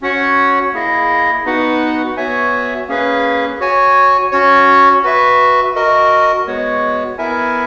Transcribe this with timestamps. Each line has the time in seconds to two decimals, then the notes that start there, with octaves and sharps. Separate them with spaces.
0.02 C#4 F#4 C#5 F#5
0.73 A#3 E4 G#4 D#5
1.45 B3 D#4 F#4 B4 F#5
2.17 B3 F#4 C#5 E5 G#5
2.88 A#3 C#4 G#4 B4
3.60 F#4 C#5 G#5
4.31 C#4 F#4 C#5
5.03 F#4 B4 E5
5.75 F#4 A#4 D#5
6.46 G#3 B3 F#4 C#5
7.18 B3 E4 A#4 E5 G#5